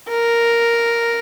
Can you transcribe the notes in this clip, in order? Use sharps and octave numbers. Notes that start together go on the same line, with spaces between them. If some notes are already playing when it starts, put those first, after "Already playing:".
A#4